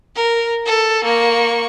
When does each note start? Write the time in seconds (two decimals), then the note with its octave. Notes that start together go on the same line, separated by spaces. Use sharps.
0.16 A#4
0.66 A4
1.04 A#3 C#6